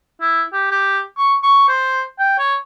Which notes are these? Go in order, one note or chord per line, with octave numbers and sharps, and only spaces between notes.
E4
G4
G4
C#6
C#6
C5
G5
C#5